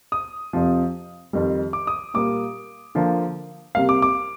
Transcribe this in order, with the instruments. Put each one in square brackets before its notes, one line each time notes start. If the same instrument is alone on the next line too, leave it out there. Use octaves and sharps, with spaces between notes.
[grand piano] D#6
F2 C3 F3
F2 D#3 G3
D6
D#6
A#2 G3 A#3 D6
D3 F3 A#3
C3 G3 A#3 F5
D6
D6